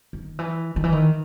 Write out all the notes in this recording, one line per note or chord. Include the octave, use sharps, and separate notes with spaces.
D#3
E3
D#3
E3
D#3